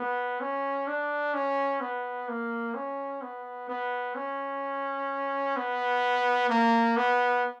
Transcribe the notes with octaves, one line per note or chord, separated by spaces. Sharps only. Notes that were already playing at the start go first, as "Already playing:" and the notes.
Already playing: B3
C#4
D4
C#4
B3
A#3
C#4
B3
B3
C#4
B3
A#3
B3